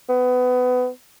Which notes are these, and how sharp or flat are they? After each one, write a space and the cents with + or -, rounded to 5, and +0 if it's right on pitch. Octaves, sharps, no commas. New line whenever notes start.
B3 +25